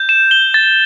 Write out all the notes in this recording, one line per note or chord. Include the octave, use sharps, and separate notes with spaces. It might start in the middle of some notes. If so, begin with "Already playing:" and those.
Already playing: G6
E7
G7
A6